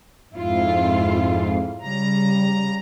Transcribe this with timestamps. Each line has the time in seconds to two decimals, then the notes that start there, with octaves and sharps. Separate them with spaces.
0.33 F2 G#2 E4 F4
1.81 C#3 G3 A#5